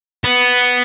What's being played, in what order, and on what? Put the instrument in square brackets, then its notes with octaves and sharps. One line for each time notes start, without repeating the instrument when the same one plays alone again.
[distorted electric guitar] B3